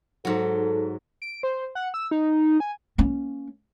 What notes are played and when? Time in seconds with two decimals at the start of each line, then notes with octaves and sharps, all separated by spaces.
0.25 G#2 F#3 A4
1.22 D7
1.43 C5
1.75 F#5
1.94 E6
2.11 D#4
2.60 G#5
2.98 A#3 C#4